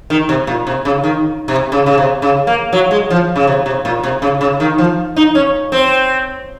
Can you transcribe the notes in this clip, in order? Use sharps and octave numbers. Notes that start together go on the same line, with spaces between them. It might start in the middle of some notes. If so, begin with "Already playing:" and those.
D#3
C3
A#2
C3
C#3
D#3
C3
C#3
C#3
C3
C#3
A#3
F#3
G#3
F3
C#3
C3
C3
A#2
C3
C#3
C#3
D#3
F3
D#4
C#4
C4